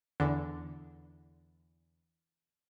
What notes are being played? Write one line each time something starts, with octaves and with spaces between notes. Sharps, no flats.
E2 D3